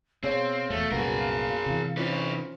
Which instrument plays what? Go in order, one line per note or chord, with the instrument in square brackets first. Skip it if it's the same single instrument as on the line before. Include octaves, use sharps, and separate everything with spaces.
[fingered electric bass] B2 [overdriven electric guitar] C4 [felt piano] G#4 C#5 [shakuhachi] F5
[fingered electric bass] E2 B2 [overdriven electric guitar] A3
[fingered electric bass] C2 A#2 [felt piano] F#2 B3 F#4 [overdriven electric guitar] G#4 A#4
[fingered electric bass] C3 E3
[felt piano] C#4 F4 C5 [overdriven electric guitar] D#4 B4